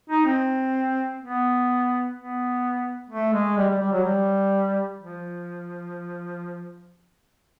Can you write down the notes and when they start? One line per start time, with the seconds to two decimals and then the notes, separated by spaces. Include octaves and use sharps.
0.10 D#4
0.25 C4
1.20 B3
2.15 B3
3.10 A3
3.33 G#3
3.57 G3
3.69 G3
3.80 G3
3.92 F#3
4.04 G3
4.99 F3